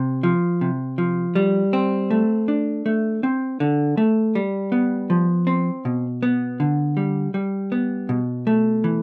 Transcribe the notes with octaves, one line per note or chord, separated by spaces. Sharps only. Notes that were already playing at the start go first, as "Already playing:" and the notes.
Already playing: C3
F3
C3
F3
G3
C4
A3
D4
A3
C4
D3
A3
G3
B3
F3
C4
B2
B3
D3
G3
G3
B3
B2
A3
E3